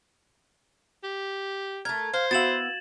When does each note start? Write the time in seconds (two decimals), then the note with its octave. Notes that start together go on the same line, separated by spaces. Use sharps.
1.03 G4
1.85 A3 A#4 G#6
2.14 C5 F5
2.31 B3 E4 F#4 F5 A6 E7 F#7